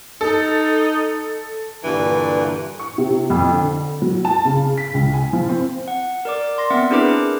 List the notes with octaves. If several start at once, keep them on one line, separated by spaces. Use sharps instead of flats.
D#4 A4
G2 A#2 D3 E3
C#6
C3
F2
D3
F#3
A5
C#3
B6
C#2
G#5
F3
C4
F#5
A#4 D5 D6
D5 C6 A#6
B3 C4 E5 F#5
D4 E4 G#4 A#4 B4 D6